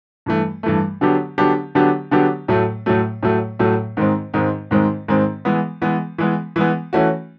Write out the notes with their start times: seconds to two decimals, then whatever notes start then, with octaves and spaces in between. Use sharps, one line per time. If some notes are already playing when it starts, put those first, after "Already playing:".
0.26 G2 E3 A3
0.63 G2 E3 A3
1.01 D3 F#3 B3 D4 G4
1.38 D3 F#3 B3 D4 G4
1.75 D3 F#3 B3 D4 G4
2.11 D3 F#3 B3 D4 G4
2.48 A2 F#3 A3
2.86 A2 F#3 A3
3.23 A2 F#3 A3
3.59 A2 F#3 A3
3.97 G#2 D#3 G#3 C4
4.34 G#2 D#3 G#3 C4
4.71 G#2 D#3 G#3 C4
5.08 G#2 D#3 G#3 C4
5.45 E3 G#3 B3
5.82 E3 G#3 B3
6.18 E3 G#3 B3
6.56 E3 G#3 B3
6.93 E3 A3 C#4 F#4